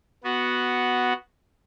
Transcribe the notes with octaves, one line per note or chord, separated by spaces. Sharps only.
B3 F#4